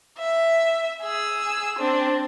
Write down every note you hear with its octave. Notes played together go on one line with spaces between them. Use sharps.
E5
G#4 E6
C4 D4